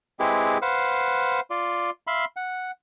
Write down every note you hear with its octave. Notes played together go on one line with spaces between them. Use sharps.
G#3 C4 E4 G4 G#4 B4
B4 C5 F5 F#5
F4 D5
E5 F5 B5 C6
F#5